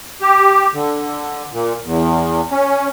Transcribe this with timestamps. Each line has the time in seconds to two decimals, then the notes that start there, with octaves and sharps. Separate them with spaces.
0.22 G4
0.74 D3
1.52 A#2
1.84 E2
2.51 C#4